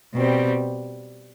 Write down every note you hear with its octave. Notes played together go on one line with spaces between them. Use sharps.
B2 G3 C4